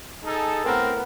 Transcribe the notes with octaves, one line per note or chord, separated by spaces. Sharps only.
D#4 G#4 A4
A2 B3 C4 A#4